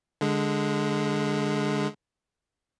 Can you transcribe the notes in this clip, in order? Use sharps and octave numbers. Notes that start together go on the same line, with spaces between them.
D3 G#3